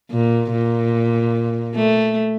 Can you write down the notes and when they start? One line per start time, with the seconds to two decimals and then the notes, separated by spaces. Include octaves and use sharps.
0.11 A#2
0.52 A#2
1.75 A3